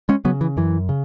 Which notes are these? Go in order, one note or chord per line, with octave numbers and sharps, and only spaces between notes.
G#3 C#4
C#3 F#3 B3
E3
F#2 E3
C#3